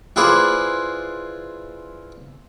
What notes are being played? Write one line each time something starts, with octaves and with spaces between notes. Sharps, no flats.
E4 F4 G#4 B4 C5 D5